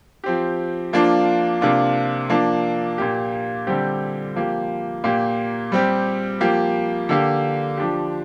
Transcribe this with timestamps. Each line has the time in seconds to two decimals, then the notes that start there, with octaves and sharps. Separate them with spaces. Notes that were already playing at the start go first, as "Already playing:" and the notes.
0.24 F3 C4 G4
0.93 F3 A#3 D4 F4
1.61 C3 A#3 D4 F4
2.29 F3 A#3 D4
2.98 A#2 A#3 G4
3.67 D3 G3 C4 G4
4.35 F3 A#3 G4
5.04 A#2 A#3 G4
5.72 G3 C4 G4
6.40 F3 A#3 G4
7.09 D3 A#3 G4
7.78 F3 D4 G4